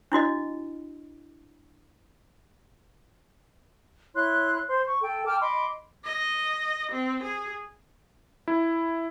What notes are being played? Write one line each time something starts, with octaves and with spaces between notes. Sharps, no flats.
D4 E4 F#4 D#5
E4 C#5 C6 F#6
C5 C6
C#6
A4 G5
G5 A5 D6 F6
D#5 B5 C6 D6
D#5
C4
G#4
E4